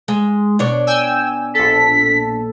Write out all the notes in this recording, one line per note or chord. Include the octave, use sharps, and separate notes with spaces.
G#3
B2 D4 C#5
G5 G#5 E6
A#1 A4 B6